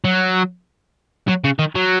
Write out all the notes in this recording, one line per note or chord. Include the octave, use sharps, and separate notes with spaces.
F#3
F#3
C#3
D#3
F#3